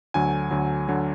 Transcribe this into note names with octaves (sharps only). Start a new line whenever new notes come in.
D2 D3 F#3 G#5
D2 D3 F#3
D3 F#3